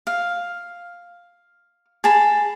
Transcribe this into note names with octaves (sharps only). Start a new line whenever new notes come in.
F5
G#4 A5 B5